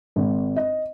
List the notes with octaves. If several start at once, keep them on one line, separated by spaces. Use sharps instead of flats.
G#1
D#5